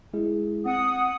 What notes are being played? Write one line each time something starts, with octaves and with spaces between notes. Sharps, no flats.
G#3 E4 G#4
C4 F#5 D#6